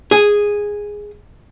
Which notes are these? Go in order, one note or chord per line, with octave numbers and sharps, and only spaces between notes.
G#4